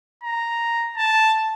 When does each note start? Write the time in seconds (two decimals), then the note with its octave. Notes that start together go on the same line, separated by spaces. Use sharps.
0.24 A#5
0.97 A5